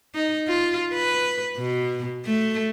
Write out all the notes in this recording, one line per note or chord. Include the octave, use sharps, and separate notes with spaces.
D#4
F4
B4
B2
A3